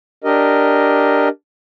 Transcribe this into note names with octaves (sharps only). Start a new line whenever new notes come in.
D4 G4 A#4 D#5